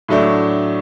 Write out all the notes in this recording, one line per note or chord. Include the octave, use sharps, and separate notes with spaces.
A2 F#3 A3 D4